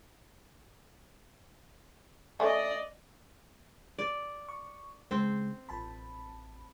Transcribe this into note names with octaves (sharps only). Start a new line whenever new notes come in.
A3 C#4 D5 D#5
D5
C#6
C#3 G#3 C4 C5
A1 A5 B5